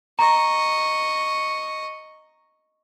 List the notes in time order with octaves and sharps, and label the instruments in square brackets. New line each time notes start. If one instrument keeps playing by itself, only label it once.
[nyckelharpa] D#5 C#6 [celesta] A#5